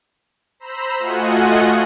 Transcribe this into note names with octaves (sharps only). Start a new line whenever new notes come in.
C5 A#5 B5 E6
A3 F4 F#4 D#5 F#5 G#5